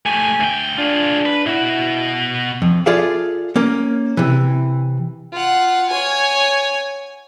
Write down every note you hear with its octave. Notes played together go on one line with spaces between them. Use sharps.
A3 G4 G#5
D2 G5
D4 F4 G#4
B4
B2 E4 F#4
F2
F4 G#4 A4 D5 E5 F5
A#3 C#4 A#4
C3 E3
F4 F#5
C#5 G#5